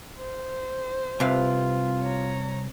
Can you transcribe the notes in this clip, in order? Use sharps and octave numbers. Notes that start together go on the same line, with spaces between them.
C5
C2 C3 F4 B4 F5
C#5 A#5